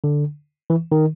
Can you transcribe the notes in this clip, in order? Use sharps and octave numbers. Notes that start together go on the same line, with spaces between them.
D3
E3
D#3